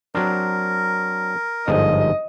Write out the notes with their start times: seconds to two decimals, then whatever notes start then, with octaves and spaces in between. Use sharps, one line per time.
0.15 F#3 C4 D4 A#4
1.68 G1 G#2 F3 D#5